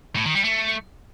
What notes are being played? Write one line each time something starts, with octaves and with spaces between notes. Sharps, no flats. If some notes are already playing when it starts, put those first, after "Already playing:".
A2
D#3
G3
A3